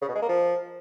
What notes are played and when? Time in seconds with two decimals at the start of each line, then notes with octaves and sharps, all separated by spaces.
0.02 C#3
0.09 B2
0.15 G#3
0.22 A#3
0.29 F3